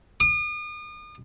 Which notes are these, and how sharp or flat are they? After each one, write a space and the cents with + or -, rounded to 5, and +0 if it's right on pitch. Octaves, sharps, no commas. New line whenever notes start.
D#6 -40